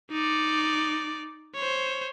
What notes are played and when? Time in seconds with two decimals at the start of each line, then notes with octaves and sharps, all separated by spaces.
0.11 D#4 D5
1.56 C5 C#5